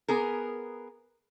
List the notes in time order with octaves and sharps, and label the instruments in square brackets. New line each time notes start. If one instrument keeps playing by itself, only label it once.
[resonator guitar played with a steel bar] B3 G#4 A#4